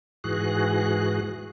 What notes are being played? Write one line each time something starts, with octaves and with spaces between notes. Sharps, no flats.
G#2 E3 F#4 G#4 F#6